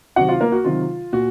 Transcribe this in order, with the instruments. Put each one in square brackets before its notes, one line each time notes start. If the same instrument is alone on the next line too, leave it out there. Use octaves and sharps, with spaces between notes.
[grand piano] C3 D#3 F#3 F#4 F#5
F4 F5
A#3 A#4
F#4
C3 D#3 F#3 F4
A#2 F#4